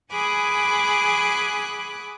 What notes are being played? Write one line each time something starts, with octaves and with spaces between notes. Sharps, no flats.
G#4 F#5 G#5 B5 D6 F#6